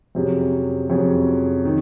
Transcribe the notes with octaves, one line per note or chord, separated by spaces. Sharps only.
F2 C3 F#3 C#4 G#4
F2 C3 F#3 C#4 G#4
D#3